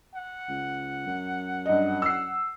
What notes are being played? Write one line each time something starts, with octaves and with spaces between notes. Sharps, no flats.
F#5
C#2
F#2
G2 D#5
E6 C7